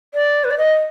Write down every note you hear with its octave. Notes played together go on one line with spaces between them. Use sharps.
D5
B4
D5
D#5